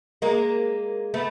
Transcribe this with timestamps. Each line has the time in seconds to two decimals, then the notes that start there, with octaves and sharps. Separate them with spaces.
0.22 G#3 A#3
1.14 A3 B3